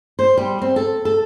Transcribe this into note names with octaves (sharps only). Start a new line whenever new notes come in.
C5
G3
C4
A4
A4